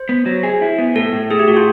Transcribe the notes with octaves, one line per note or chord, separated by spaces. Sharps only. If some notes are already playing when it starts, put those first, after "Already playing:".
Already playing: C5
B3
F#3
G#4
E4
B3
A2 A4
A2
A3 G#4
G4
A2 F#4
F4